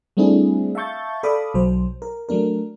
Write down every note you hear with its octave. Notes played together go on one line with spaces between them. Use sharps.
G3 A3 C4 D4 E4 G#4
E5 F5 A5 C#6 G6 A6
A4 D5 F5 B5 D6 D#6
B1 F#3 C5
A#4
F#3 A3 D4 A#4